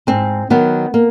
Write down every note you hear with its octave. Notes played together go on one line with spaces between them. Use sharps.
G#2 C4
D#3 F#3 B3
A#3